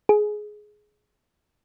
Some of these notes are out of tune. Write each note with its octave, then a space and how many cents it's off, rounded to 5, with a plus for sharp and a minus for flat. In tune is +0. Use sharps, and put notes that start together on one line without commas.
G#4 +15